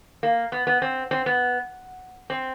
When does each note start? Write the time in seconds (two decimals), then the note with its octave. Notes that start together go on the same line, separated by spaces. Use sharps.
0.23 A#3
0.52 B3
0.67 B3
0.82 C4
1.11 C4
1.26 B3
2.30 C4